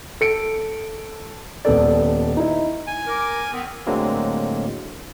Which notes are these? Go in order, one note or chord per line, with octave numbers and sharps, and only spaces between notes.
A4 C#7 D7
D#1 B3 A4 D5
D#4 E4
G#5
A#4 D6
D#3 B3 C4
A2 D3 F#3 G#3 A#3 C4